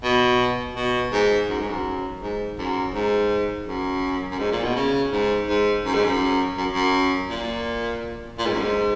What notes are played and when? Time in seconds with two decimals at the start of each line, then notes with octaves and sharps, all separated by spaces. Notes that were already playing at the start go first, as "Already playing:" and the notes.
0.04 B2
0.76 B2
1.12 G#2
1.49 F#2
1.59 G#2
1.70 F#2
2.21 G#2
2.58 F#2
2.94 G#2
3.67 F#2
4.31 F#2
4.39 G#2
4.52 A#2
4.63 B2
4.76 C#3
5.12 G#2
5.48 G#2
5.85 F#2
5.94 G#2
6.04 F#2
6.57 F#2
6.73 F#2
7.29 A#2
8.39 A#2
8.46 G#2
8.53 F#2
8.61 G#2